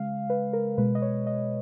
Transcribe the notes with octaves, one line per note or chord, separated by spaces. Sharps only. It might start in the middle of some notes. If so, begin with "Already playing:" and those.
Already playing: C#3 G#3 F5
B4
A#4
B2 G#3 B4
D#5
C#5
D#5